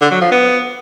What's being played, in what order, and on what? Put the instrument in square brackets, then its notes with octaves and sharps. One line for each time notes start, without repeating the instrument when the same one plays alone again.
[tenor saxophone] D3
F#3
F3
B3